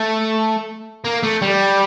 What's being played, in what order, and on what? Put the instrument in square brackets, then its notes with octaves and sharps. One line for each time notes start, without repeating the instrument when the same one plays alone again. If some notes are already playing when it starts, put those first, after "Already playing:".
Already playing: [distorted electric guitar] A3
A#3
A3
G3